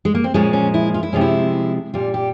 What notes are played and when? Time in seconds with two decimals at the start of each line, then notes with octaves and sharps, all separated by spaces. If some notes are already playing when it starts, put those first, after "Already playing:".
0.05 G#3
0.15 A#3
0.24 C4
0.34 A#2 F3 G#3 C#4
0.53 C#4
0.74 E4
0.94 F4
1.03 E4
1.13 C3 F3 G#3 C#4
1.21 E4
1.94 A#2 G3 F4
2.14 G4